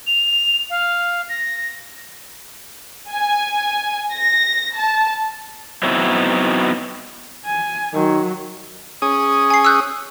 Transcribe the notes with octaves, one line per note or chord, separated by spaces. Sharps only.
F7
F5
A#6
G#5
A#6
A5
F#3 B3 C4 D#4 E4 C#5
G#5
D#3 F#3
C#4 G#4 D#6
G#5 C7
E6 F#6 G6